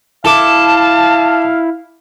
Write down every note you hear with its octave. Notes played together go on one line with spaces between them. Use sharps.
E4 A4 F5 A5 D6